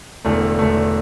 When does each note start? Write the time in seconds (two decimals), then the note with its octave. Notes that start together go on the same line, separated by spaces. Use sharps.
0.24 E1 E2 D3 A3
0.59 E1 E2 D3 A3